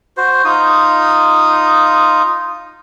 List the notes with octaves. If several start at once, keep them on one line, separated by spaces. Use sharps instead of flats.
F#4 C5
D#4 F4 D#6